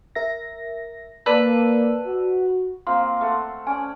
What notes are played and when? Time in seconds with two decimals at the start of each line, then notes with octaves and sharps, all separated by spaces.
0.15 A#4 E5 A#6
1.26 A#3 B4 D5 A5 E6
2.04 F#4
2.87 A#3 C4 F4 C6
3.21 A3 C5 F#5
3.67 C#4 D5 G#5